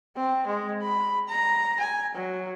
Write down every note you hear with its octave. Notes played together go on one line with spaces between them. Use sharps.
C4
G#3
B5
A#5
G#5
F#3